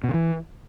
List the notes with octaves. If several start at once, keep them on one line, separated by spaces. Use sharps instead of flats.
B2
C#3
E3